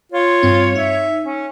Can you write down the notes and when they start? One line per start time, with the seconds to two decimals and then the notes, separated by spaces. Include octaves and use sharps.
0.12 F4 C#5
0.43 G2 C4
0.75 D#4 E5
1.24 C#4